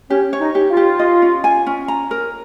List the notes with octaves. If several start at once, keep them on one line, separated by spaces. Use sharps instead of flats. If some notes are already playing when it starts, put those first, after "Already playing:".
C#4 G4
C#5
D#4
G4
F4
G4
D#5
C#4
G#5
C#4
A#5
A#4